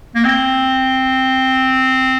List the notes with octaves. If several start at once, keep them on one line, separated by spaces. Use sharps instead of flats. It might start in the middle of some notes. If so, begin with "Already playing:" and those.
A#3
C4